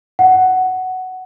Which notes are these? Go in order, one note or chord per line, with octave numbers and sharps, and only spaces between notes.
F#5